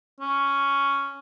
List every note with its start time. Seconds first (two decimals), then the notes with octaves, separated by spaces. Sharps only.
0.21 C#4